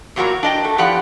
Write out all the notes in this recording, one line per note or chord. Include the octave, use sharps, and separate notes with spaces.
E2 A#2 F#3 F#4 A#4 A#5
D4 D#5 G5
A3
E2 F3 B3 G4 D5 F#5